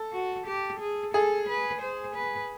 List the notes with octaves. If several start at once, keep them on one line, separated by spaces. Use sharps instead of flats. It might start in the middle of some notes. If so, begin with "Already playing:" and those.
Already playing: A4
F#4
G4
G#4
G#4 A4
B4
C5
B4